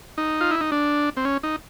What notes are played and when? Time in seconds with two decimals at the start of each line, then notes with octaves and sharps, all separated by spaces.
0.18 D#4
0.41 F4
0.51 E4
0.61 D#4
0.72 D4
1.17 C4
1.25 C#4
1.43 D#4